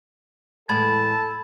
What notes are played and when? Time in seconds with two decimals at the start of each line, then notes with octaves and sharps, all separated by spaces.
0.69 E2 A2 G#3 A4 A5 B5 G#6